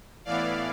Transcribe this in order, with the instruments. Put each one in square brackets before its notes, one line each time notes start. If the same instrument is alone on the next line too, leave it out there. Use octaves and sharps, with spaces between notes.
[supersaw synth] A2 E3 B3 E4 D5 F5